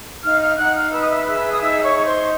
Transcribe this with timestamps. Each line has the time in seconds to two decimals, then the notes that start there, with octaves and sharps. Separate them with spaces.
0.23 D#4 F5 F6
0.41 F5 F6
0.57 D#4 F#5 F#6
0.75 F5 F6
0.92 B4 E6
1.01 D#6
1.10 E5 E6
1.26 G#4 E5 E6
1.52 D#6
1.60 D#4 E5 E6
1.83 C#5 C#6
1.95 D#4 C#6
2.06 C5 C6